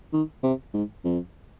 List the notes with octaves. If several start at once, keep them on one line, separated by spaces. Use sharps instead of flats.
D#3
C3
G#2
F2